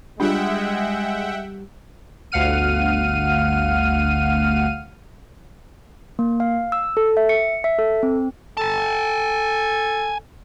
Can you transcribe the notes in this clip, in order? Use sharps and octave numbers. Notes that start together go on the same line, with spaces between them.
G3 G#3 D4 F4 G4 E5 F#5 G5
G1 D2 F5 F#5 F6 D#7
A#3
F5
E6
A4
E5
C#7
E5
A4
C4
A4 G#5 A5